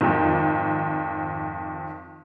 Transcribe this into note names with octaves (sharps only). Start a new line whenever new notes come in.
G#1 F2